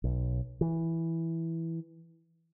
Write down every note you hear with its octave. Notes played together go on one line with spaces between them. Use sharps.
B1
E3